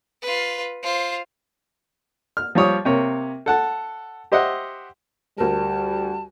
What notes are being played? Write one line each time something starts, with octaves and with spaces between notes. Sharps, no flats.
F4 B4
F4 C5
F6
F3 G3 C#5 D#6
C3 A#3 C#5
A4 F#5 A5
G4 C5 D#5 E5 F#5
D2 G3 A#4 A5